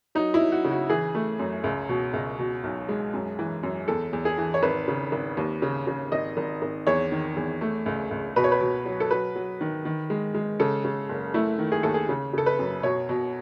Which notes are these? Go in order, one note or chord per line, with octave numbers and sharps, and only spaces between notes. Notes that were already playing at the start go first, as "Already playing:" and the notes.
F#3 D#4
E4
F#3
F#4
C#3
F#4
E3 G#4
A3
F#2
C#2
B2
C#2
B2
B1
G#3
F#2
E3
F#2
E2 A4
E2
G#4
E3
C#5
G#1 B4
C#3
G#1
D#2
C#3
C#3
G#1 D#5
G#1
G#1
E2 C#5
D#3
E2
A3
C#2
C#2
B2 B4
C#5
B4
B2
F#3
A4
F#3 B4
F#3
D#3
D#3
G#3
G#3
C#3 A4
C#3
F#1
A3 E4
D#3
G#4
D#2 A4
G#4
C#3
C#3 A4
B4
F#2
B2 C#5
B2